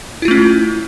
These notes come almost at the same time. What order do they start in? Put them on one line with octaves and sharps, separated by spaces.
E4 F4 A3 C#4